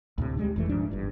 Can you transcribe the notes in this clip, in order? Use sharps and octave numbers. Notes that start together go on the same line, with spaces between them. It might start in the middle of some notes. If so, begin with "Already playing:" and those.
D2 A2 C3
G3 G#3 D4
F#1 F2 E3 A3
D#1 G#2 F3 D4
G1 G2